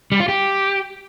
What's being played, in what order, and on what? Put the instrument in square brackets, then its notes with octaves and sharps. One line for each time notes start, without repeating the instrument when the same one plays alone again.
[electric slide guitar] G3
F4
G4